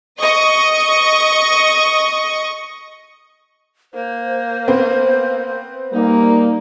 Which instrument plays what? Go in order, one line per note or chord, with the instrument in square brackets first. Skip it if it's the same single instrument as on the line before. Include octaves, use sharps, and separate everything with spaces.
[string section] D#5 C#6
[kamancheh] A#3 [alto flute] C5
[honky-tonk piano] B3 C4
[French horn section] G3 A#3 [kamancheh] D#4